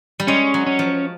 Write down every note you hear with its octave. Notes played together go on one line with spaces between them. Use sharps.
G3
G#3 C#4
F#3
C#4
F3